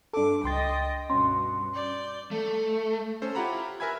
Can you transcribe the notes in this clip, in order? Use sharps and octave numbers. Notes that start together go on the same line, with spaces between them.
G2 D4 A4 D6
C#2 D#5 G5 C6 A6
G2 B2 C#4 C6
D5 G6
A3
C#4 A4 C5
E4 F4 G4 F#5 A#5 B5
A#4 B4 E5 G#5 B5 G#6